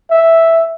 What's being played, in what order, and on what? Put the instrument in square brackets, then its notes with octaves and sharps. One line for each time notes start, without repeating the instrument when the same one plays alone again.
[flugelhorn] E5